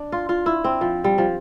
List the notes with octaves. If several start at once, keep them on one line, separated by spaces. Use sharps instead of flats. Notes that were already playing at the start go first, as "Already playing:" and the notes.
Already playing: D4
F4
F4
E4
C4
F3
G3
F3